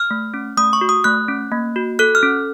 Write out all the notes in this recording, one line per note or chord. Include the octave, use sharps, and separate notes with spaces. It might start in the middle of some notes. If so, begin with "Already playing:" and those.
Already playing: F6
A3
C#4
A3 D#6
C#6
F#4
D#6
A3 F#6
C#4
A#3
F#4
A4 F#6
F6
C#4